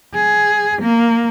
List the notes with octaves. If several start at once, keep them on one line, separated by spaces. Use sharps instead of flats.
G#4
A#3